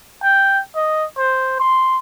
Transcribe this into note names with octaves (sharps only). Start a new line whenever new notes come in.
G5
D#5
C5
C6